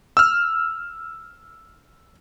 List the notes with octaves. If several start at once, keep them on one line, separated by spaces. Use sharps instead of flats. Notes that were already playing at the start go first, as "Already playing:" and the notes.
E6 F6